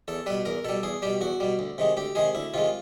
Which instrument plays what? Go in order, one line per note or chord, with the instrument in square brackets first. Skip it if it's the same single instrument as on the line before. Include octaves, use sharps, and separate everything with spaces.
[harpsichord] E2 A4
B2 G3 B4
E2 A#4
B2 G3 A4
E2 G#4
B2 G3 G4
E2 F#4
B2 G3
D2
C3 D#3 G#3
D2 G4
C3 D#3 G#3 G#4
D2 E4
C3 D#3 G#3 F4